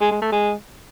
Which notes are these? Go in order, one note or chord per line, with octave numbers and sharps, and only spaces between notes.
G#3
G#3
A3
G#3